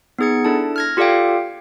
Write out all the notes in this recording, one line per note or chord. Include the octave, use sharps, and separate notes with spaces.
B3 D#4 G#4 G#6 C#7
D4 E4 A4 A5
F6 G#6 A#6
F4 G4 A4 D5 F5 G5